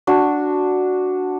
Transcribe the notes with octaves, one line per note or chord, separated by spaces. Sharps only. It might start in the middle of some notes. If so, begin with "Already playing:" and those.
D4 F#4